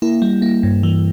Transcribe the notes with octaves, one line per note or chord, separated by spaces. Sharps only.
A#3 E4
G3
A#3
G2
E3